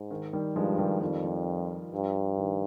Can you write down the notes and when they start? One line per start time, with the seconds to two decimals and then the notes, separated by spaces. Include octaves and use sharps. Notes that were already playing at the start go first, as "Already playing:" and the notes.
Already playing: G#2
0.11 D#3
0.33 D#3 G3
0.55 G2 F3 G#3
0.78 D#3 G3
1.01 F2 D#3 G3
1.24 F3
1.92 G2
2.38 D#3